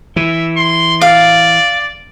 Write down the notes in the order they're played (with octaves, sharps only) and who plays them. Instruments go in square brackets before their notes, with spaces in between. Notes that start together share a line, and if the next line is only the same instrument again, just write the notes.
[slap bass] E3 [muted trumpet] E5
[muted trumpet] C6
[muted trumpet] D5 [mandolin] F5